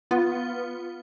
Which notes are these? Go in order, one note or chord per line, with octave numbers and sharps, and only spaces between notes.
B3 F4 B4